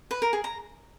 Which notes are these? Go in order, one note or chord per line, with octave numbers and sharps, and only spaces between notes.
B4
A#4
G#4
A#5